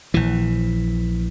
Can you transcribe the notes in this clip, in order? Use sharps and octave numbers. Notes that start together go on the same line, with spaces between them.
A#1 E3